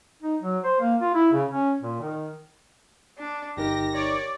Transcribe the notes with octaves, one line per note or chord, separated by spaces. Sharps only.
D#4
F#3
C5
A#3
F4
E4
C#3
C#4
A#2
D#3
D4
G1 D#4 G4 A#4 A#6
C#5 D5